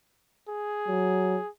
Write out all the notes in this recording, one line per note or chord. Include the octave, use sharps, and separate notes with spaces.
G#4
F#3